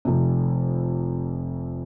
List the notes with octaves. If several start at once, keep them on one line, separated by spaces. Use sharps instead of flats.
F1 F2 C3